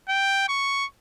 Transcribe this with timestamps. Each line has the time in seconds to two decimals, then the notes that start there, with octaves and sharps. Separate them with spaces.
0.09 G5
0.49 C#6